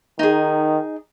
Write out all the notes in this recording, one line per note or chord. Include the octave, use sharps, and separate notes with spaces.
D#3 D#4 G#4